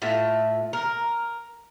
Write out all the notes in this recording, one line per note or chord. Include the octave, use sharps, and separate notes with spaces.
A2 F4 E5 F#5
A#4